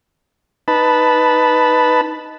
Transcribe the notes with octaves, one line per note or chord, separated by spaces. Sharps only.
D#4 B4 A5 B5